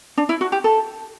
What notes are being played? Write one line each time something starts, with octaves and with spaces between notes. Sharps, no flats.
D4
E4
F#4
G4
A4